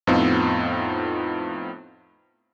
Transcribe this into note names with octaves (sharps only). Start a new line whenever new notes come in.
F2 A2 B3 C4 D#4 F4